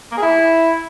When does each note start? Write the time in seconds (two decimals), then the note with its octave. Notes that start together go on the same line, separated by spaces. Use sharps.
0.12 A#3
0.17 G#4
0.23 E4